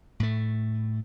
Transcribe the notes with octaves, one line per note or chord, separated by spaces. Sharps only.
A2 A3